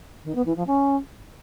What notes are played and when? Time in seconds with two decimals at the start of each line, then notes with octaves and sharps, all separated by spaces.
0.24 D#3
0.35 B3
0.46 E3
0.56 F3
0.67 C#4